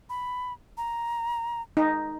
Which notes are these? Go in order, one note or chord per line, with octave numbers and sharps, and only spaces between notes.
B5
A#5
D#4